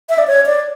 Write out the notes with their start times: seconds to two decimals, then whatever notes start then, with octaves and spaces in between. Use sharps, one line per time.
0.09 E5
0.18 D5
0.27 C#5
0.46 D5